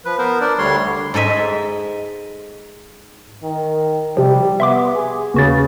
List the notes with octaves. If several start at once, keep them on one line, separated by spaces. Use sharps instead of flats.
F3 B4
B3 A#4 C5
D4 A#4 D5
D2 D3 G3 C#5 C6
G#2 A4 D#5 E5
D#3
C3 F3 G3
B3 E5 C6 D6
G#4
D#2 C#3 F#4 B4 A6